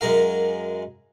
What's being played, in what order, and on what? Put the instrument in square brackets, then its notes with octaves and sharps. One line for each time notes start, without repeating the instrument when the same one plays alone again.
[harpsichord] F#2 G#3 A#4 F5